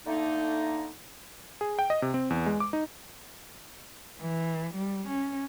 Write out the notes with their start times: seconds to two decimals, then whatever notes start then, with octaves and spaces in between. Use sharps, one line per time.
0.06 D3 A3 A#3 D#4
1.61 G#4
1.79 G5
1.90 D#5
2.02 C3
2.14 C4
2.30 E2
2.46 G#3
2.60 D6
2.73 D#4
4.21 E3
4.74 G3
5.07 C#4